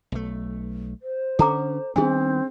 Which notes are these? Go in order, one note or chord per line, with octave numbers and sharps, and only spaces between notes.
B1 A3
C5
D3 C#4 A4 A#5 D6
D#3 G3 B3 C4 D4 G#4